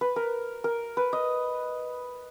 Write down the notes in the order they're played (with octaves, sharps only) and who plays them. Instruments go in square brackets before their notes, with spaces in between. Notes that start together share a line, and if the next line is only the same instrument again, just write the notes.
[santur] B4
A#4
A#4
B4
D#5